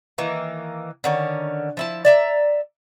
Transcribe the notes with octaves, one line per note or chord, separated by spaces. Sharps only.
D#3 E3 A#3
D3 D#3 C#4
F3 E4 A5
D5 E5 A#5